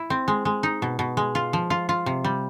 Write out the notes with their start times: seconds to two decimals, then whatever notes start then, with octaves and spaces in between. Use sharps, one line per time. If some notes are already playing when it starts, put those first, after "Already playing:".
Already playing: E4
0.10 C4
0.28 G#3
0.45 G#3
0.63 D#4
0.82 B2
0.99 B2
1.17 G#3
1.35 F4
1.53 F3
1.70 F4
1.89 F4
2.06 C3
2.24 G3